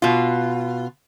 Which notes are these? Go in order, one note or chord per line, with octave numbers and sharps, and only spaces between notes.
B2 F4